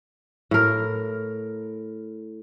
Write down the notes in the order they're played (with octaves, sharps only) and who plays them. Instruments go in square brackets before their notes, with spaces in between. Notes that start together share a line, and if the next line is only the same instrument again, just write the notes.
[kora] A2 A#4